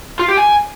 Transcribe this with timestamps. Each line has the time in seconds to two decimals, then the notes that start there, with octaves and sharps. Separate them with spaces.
0.19 F4
0.28 G4
0.38 G#5